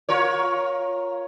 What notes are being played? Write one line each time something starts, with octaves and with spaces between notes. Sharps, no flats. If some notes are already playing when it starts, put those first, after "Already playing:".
F4 A#4 C#5